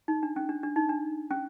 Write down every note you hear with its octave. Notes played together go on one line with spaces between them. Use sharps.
D#4
D4
C#4
D4
D4
D#4
D4
C#4